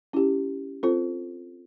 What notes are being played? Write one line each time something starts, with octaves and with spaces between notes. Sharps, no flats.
C#4 E4 G4
C4 F4 A4 C5